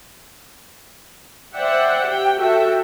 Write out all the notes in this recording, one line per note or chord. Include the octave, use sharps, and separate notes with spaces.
C5 D5 E5 F#5 G5
G4 G5
F#4 A4 E5 G5